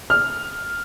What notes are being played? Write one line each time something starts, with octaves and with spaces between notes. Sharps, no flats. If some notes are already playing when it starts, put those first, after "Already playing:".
F6